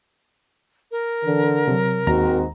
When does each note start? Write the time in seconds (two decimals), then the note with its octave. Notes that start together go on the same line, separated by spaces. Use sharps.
0.91 A#4
1.24 D3 E3
1.68 C3 F#3
2.07 D#2 G#2 D#3 C4 F#4 A#5